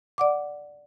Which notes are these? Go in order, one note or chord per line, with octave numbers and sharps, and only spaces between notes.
D5 F#5 D6